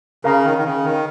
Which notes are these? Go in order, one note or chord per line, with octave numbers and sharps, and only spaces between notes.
C#3 A#4 F5 A#5
D#3
D#3
C#3
D#3